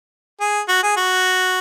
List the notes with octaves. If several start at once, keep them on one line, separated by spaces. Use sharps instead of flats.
G#4
F#4
G#4
F#4